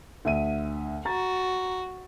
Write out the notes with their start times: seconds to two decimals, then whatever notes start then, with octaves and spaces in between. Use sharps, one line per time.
0.25 D2 E5 D#7
1.05 F#4 A#5 A6